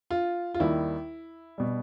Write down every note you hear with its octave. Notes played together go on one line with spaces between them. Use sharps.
F4
F4
D#2 D#3 G3 E4
B2 G3